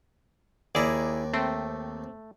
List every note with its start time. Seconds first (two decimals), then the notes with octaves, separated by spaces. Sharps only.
0.75 D#2 E4 G#4 D5 A#5
1.34 A3 C4